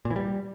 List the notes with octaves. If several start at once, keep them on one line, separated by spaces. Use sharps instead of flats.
A#2
E3
G3